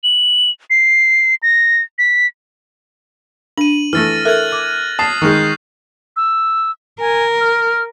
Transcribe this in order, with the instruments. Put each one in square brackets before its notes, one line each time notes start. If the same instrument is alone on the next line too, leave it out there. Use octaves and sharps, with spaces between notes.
[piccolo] F#7
C7
A#6
B6
[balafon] D4 [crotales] D#7 F#7
[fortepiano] E3 A3 [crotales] F6 A6 A#6
[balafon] A4 A#4 E5 [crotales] F#6 G#6 F#7
[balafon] D6
[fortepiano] A5 [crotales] D#6 C7
[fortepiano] D#3 G#3 [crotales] C#6 G6
[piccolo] E6
[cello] A#4 [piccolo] G#5
[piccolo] F6